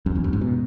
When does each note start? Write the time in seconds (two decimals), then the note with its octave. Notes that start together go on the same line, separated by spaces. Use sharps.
0.06 F#2
0.15 E2
0.24 F#2
0.33 G#2
0.41 B2